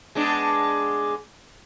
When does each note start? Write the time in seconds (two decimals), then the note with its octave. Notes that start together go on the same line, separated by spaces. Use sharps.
0.15 G#3 B3 D4